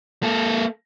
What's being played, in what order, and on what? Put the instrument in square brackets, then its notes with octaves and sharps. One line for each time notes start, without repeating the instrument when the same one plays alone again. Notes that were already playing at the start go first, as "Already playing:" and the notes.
[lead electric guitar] A#3 A4